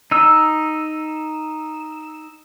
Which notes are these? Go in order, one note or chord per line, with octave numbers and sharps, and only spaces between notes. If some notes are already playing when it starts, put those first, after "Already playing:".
D#4 E6